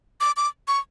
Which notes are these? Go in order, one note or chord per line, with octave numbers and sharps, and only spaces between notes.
D6
D6
C#6